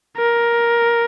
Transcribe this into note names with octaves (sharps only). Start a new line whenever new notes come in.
A#4